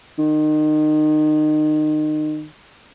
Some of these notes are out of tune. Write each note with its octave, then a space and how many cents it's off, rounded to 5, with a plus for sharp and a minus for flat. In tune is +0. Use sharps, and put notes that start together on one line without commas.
D#3 -30